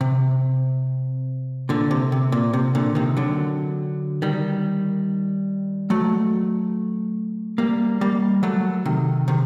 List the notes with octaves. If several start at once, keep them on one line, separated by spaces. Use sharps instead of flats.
C3
A#2 D3
C3
C3
A#2
C3
A#2 D3
C3 D#3
D3 F#3
D#3 G3
F#3 A3
G3 A#3
G3 A#3
F#3 A3
C3 D#3
C3 D#3